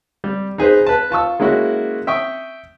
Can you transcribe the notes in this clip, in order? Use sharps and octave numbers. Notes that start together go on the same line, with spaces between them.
G3
D#4 G#4 B4 C5
B4 A5
F4 A5 C#6 E6
G#3 A#3 C#4 E4 F#4
E5 G5 C#6 D#6